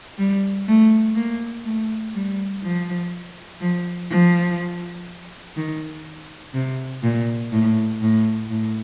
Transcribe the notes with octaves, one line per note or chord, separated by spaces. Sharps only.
G3
A3
A#3
A3
G3
F3
F3
F3
D#3
C3
A#2
A2
A2
A2